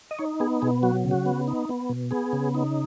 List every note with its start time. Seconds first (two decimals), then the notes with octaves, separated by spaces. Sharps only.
0.11 D#5
0.19 D#4 C#5
0.40 B3 G#4
0.62 B2 G#4
0.83 F#3 F#4
1.04 C#3
1.11 F#4
1.26 B3
1.47 D#4
1.69 B3
1.89 B2
2.11 B3 G#4
2.33 C#3
2.55 D#4